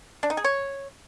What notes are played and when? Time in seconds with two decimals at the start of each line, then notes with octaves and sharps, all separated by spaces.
0.23 D4
0.30 D#4
0.37 G#4
0.44 C#5